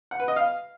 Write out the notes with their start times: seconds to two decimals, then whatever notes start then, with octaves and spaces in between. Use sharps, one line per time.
0.11 F#5
0.20 B4
0.28 D#5
0.36 F5